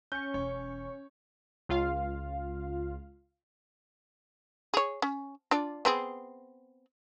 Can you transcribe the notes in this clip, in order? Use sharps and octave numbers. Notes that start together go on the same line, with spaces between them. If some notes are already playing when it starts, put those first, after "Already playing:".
C#4 C#6 G6
E1 E2 C#5
C#2 F4 F5
G#4 C#5
C#4
D4 F4 D5
B3 C4 G#4